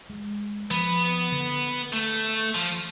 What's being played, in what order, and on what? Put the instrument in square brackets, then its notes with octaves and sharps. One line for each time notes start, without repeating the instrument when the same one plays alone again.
[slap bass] G#3
[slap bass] F3 [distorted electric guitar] B3
[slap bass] D3
[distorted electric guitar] A3
F3